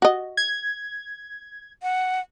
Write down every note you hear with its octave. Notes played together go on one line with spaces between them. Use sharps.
F#4 D#5
G#6
F#5